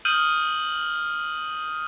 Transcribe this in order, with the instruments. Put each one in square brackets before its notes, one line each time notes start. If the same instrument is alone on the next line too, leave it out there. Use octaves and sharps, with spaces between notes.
[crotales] D#6 F6 G6 D#7 F#7